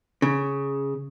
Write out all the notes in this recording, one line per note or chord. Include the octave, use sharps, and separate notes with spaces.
C#3